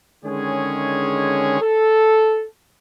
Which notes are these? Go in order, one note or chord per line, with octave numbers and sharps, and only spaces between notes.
D3 D#3 G#3 C#4 G#4 C#5
A4